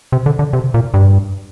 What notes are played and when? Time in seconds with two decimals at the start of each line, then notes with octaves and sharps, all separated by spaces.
0.12 C3
0.26 D3
0.39 D3
0.53 C3
0.74 A#2
0.94 G2